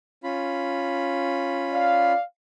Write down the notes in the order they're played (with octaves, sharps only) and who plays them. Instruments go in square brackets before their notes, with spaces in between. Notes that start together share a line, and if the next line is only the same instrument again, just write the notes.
[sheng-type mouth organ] C#4 F4 B5
[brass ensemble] D5 F5